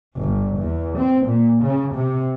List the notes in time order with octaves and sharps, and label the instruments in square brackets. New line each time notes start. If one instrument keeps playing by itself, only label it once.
[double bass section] G1
E2
C4
A#2
C#3
C3